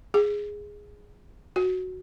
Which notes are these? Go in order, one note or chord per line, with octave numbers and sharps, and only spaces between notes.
G#4
F#4